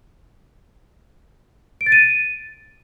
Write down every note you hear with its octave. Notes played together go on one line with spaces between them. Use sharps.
D7
A6
D#7